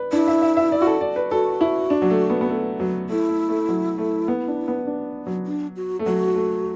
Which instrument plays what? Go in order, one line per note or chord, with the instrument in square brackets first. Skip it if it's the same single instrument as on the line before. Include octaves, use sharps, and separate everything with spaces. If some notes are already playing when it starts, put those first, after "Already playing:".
Already playing: [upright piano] B4 D5
[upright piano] D4 [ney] E4
[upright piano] E5
E5
E5
D5
F#4
A4
D5
B4
[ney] F#4 [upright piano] A4
[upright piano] E4
D4
F#3
A3
B3
B3
A3
F#3
[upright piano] A3 [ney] E4
[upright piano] A3
A3
F#3
A3
B3
D4
B3
D4
F#3
[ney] D4
F#4
[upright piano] A3
[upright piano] F#3 [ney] F#4
[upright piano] A3